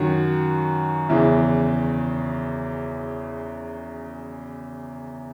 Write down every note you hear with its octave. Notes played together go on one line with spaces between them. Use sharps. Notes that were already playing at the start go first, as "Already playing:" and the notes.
Already playing: F#2 D#3 F#3 F#4
E2 C#3 E3 E4